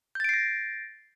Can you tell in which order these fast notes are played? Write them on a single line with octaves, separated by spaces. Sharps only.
G6 A6 D7 C7 A#6